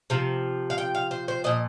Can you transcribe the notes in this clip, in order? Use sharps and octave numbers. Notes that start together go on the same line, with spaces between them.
C3 F3
F5
G5
F5
C5
C5
A#2 F3 D#5